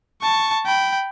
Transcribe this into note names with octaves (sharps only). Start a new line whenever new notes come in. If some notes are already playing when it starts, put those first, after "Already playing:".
A5 C#6
G5 B5